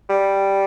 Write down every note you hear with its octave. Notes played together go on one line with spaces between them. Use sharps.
G3